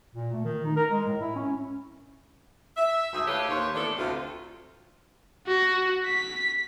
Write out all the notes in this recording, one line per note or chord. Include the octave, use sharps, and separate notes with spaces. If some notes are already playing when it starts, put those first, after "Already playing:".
A#2
A3
D#3
D#4
A#4
G#3
A2
E4
C#4
E5
D2 G#2 G#4 E5
A2 A3 G4 B4 C#5 F5
D#2 D#3 A#3 C5 C#5
A2 E3 B3 D4 A4
D2 C3 F4
F#4
B6